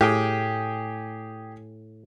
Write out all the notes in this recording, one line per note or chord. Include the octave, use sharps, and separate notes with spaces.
A2 G4 G#4 G5